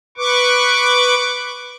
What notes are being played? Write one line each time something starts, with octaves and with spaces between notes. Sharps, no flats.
B4 C#6 D6